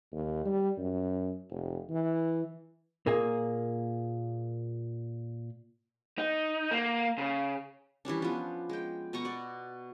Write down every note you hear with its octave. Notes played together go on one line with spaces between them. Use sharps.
D#2
G3
F#2
F1
E3
A#2 A#3 G#4
D#4
A#3
C#3
E3 G3 C#4 D4
F3 B3
G#3 G5
B2 B3 A#5 C#6
F#4 D5